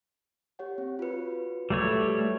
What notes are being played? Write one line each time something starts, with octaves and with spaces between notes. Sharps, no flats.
G4 C#5 F#5
C4
F4 F#4 B4
G3 A3 C#5